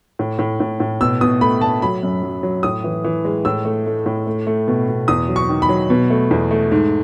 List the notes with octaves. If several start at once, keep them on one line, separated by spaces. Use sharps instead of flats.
A2
A2
A2
A2
B2 E6
B2 D#6
A3 B5
A3 A5
F#3 B5
F#2
F#3
F#3
A2 D#6
E3
E3
G#3
A2 E6
A3
A3
A2
A3
A3
B2
B2
E2 D#6
F#3
C#6
D#3
B5
F#3
B2
A3
E2
A3
G#2